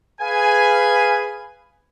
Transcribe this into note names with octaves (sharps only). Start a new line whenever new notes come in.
G#4 B4 F5 G#5